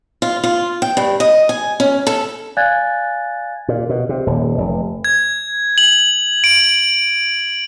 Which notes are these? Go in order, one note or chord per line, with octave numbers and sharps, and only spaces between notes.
F4
F4
G5
G2
D#5
G#5
C#4
A4
D5 F5 G#5 F#6 G#6 A6
A#2
B2
C3
D#1
F1
G#6
F#7
D7